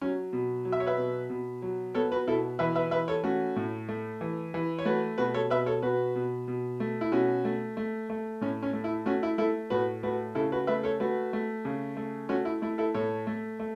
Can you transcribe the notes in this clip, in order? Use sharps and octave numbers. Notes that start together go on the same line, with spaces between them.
F#3 C#4
B2
F#3
E5
C#5
B4 E5
B2
B2
F#3
B3 A4 C#5
F#4 B4
B2 E4 A4
E3 B4 E5
B4 E5
E3 B4 E5
A4 C#5
A3 C#4 F#4
A2
A3
E3
E3
C#5
A3 F#4 B4
B2 F#4 B4
A4 C#5
B2 B4 E5
A4 C#5
B2 F#4 B4
B2
B2
A3
E4
B2 C#4 F#4
A3
A3
A3
A2 C#4
C#4
A3
E4
A3 C#4 F#4
E4
A3 E4 A4
A2 F#4 B4
A3 F#4 B4
C#3 E4 A4
F#4 B4
A3 B4 E5
A4 C#5
A3 F#4 B4
A3
C#3
A3
A3 C#4 F#4
E4
A3 E4
E4 A4
A2 A4 C#5
A3
A3